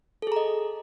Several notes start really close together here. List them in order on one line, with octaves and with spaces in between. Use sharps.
A4 G#4 A#5 D#5